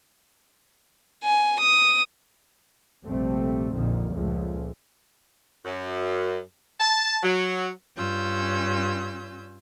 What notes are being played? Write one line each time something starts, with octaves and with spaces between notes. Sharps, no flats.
G#5
D#6
A#1 F2 C3 G3 A3 C4
A#1 F2 A#2 D3 D#3
C#2 A#2 F3 G#3 A3
F#2
A5
F#3
G2 C#4 F4 E6 G6